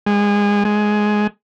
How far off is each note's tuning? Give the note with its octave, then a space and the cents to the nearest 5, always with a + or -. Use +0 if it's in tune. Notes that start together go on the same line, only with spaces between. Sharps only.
G#3 -25
G#3 +10